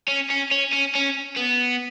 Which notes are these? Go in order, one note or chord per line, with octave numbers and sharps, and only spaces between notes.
C#4
C#4
C#4
C#4
C#4
B3